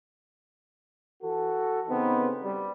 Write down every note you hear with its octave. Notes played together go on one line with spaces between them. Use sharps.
E3 F#4 A4
C#3 B3 C4 D#4 B4
G3